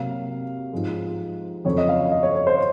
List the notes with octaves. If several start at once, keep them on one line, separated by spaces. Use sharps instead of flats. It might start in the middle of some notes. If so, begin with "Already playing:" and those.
Already playing: C3 F#3 A#3 F5
G#2 F3 G#3
F2 C#3 F#3 C4 C#5
D#5
F5
D#5
C#5
C#5
C5